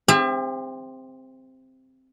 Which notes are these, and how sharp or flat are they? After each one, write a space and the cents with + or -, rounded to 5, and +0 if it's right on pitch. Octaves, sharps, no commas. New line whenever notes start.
C4 +0 G4 +45 E5 +30